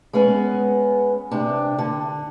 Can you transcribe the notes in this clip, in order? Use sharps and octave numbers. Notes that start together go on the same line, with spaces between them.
G#3 B3 C#4
C3 D4
D3